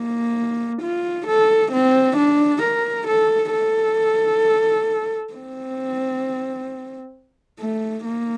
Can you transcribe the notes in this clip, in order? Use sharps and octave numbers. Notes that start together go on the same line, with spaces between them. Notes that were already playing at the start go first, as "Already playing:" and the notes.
Already playing: A#3
F4
A4
C4
D4
A#4
A4
A4
C4
A3
A#3